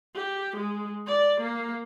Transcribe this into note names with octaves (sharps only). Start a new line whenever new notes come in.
G4
G#3
D5
A#3